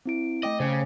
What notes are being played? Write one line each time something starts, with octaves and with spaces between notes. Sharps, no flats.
C4 E4 D7
A3 D#5 G5 D6
C#3 C#4 C5